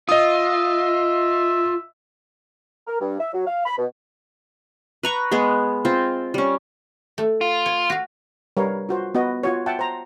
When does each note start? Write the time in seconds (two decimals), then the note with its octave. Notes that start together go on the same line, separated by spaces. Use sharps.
0.09 F4 D#5 E5 D#6
2.88 A#4
3.01 G2
3.20 E5
3.33 F#3
3.47 F5
3.66 B5
3.78 B2
5.03 B4 A#5 C#6
5.31 G#3 B3 G#4
5.85 C4 F4
6.34 G3 C#4
7.18 A3
7.41 F4
7.66 C#5
7.90 F#4 F5
8.57 G3 A#4 B4 C#5 F5
8.89 F4 F#4 C5
9.15 B3 F#4 D#5
9.43 F4 F#4 C#5
9.66 E5 F#5 G5 A5
9.79 C5 A#5